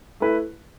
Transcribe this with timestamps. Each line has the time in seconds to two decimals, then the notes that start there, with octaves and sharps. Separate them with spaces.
0.20 A3 E4 B4